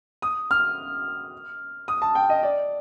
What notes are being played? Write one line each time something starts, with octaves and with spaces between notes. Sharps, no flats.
D#6
F6
D#6
A5
G5
D#5
D5